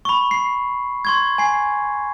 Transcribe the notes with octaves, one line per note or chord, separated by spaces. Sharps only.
B5 C#6
C7
C6 C#6 G#6
G#5 C7